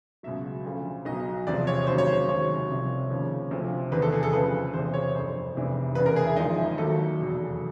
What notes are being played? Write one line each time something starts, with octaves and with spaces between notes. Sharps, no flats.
C#2 B2 F#3 E5
D2 C#3 F3
B1 B2 F#3 D#5
E2 C3 F3 D5
C#5
D#2 C#3 F#3 C5
C#5
C5
C#2 C3 D#3 F#3 C#5
C2 C3 F3
D#2 C#3 F3
D2 C3 F3
E2 C3 D#3 B4
A4
G#4
A4
D2 C#3 F3 B4
E1 E2 C3 E3 C5
C#5
G1 F2 D3 C5
F1 E2 C3 E3
E1 E2 C#3 B4
A#4
G#4
E4
G#1 G#2 F3 D#4
E4
D#2 D#3 F#3 A4
F1 E2 B2 F#3